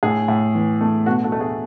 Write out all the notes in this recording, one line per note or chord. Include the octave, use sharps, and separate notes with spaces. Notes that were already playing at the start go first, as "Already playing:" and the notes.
A2 G#4
A2
E3
A3
B2 F#4 A4
F#4 A4
A3
G#4